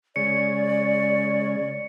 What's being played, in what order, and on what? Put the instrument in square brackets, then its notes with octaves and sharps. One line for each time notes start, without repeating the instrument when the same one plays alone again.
[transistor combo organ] C#3 G#3 C#5 [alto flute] D5 [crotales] C#7